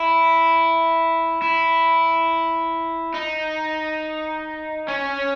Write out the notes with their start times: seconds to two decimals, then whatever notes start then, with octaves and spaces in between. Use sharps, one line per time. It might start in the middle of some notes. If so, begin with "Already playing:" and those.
Already playing: E4
1.42 E4
3.14 D#4
4.88 C#4